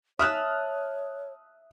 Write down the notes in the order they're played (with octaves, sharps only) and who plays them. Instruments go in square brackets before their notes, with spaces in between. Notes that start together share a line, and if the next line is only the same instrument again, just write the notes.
[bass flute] C#5 [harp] E5 A5 [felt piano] D#6 F6 F#6